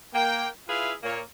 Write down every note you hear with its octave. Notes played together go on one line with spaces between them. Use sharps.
A#3 G5
E4 F4 G#4 B4 E5 F5
A#2 A#3 C#5